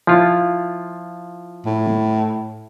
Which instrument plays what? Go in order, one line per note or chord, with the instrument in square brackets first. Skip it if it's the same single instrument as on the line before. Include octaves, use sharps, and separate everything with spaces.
[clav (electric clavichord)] F3 E4 F4
[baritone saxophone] A2